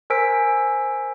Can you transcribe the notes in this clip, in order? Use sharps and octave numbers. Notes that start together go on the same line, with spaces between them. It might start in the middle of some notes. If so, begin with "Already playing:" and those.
A#4 C5 G#5 E6 B6 D7